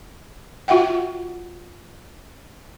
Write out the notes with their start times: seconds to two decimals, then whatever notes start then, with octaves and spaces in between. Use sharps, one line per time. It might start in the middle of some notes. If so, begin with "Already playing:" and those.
0.68 F4 F#4 E5 F#5 G5